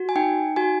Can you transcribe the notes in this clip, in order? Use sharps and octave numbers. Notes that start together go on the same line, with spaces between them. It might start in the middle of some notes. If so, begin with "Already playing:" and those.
Already playing: F#4
G#5
D#4 G5
F#4 G#5